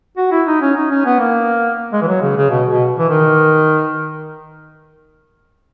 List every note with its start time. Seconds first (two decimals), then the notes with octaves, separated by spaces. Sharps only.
0.17 F#4
0.32 E4
0.47 D#4
0.62 C#4
0.76 D#4
0.91 C#4
1.05 B3
1.20 A#3
1.93 G#3
2.02 E3
2.07 F#3
2.22 C#3
2.36 C#3
2.50 B2
2.71 B2
2.99 E3
3.09 D#3